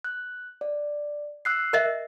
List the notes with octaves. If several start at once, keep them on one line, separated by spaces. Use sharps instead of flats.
F#6
D5
E6 F#6 C7
A#4 D#5 E5